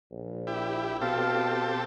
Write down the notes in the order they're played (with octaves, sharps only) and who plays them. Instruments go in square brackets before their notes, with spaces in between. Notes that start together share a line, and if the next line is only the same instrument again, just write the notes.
[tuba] A#1
[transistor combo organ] E4 G4
[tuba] B2 [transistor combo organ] C4 G4 A4 [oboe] F5